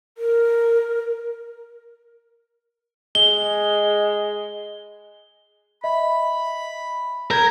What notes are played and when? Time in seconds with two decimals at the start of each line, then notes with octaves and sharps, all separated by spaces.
0.18 A#4
3.15 G#3 G7
5.84 D#5 E5 B5
7.31 A#4 G6 G#6